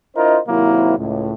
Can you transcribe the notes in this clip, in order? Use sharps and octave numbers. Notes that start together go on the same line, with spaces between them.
D4 E4 F4 A#4 C5 D#5
C3 D#3 F#3 A#3 C4 E4
C#2 A2